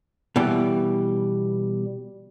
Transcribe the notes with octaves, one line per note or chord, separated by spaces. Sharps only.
B2 E3 G3